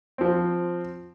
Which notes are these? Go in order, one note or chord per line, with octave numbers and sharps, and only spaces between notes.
F3 C4